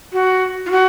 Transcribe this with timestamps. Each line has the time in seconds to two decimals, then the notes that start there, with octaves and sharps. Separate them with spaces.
0.13 F#4
0.66 F4
0.71 F#4